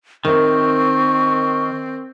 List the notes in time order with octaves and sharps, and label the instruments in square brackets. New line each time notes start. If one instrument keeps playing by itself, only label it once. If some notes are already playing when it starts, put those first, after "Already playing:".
[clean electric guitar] D#3 [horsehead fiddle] C4 [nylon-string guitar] A#4 C#5 E5 [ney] C#6